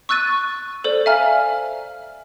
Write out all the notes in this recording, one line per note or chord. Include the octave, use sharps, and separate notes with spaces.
C#6 E6 F#6 A6 D#7
A4 C5 D5
E5 F5 G#5 A#5 F6